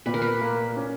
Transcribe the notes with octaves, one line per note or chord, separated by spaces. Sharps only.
A#2 B4
A#4
B4
A#3
C#4